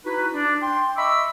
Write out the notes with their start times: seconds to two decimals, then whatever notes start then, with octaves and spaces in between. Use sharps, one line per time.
0.05 D#4 E4 F#4 B4
0.34 D4
0.62 G5 C6
0.96 D#5 E5 B5 C#6 D6 E6